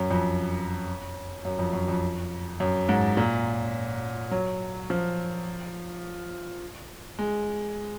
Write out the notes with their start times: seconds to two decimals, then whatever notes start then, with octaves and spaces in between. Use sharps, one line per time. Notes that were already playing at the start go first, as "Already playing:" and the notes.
Already playing: F#2
0.11 F2
1.45 F#2
1.59 F2
1.73 F#2
1.88 F2
2.60 F#2
2.89 G#2
3.17 A#2
4.31 F#3
4.90 F3
7.19 G#3